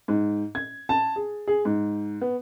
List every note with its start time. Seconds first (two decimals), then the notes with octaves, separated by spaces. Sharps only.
0.08 G#2
0.55 G#6
0.89 A5
1.16 G#4
1.47 G#4
1.65 G#2
2.21 B3